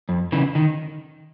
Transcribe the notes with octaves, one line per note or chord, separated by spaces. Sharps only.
F2
C#3 E3
D#3